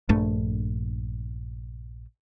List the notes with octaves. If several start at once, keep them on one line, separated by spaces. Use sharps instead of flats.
A#1 G2 A3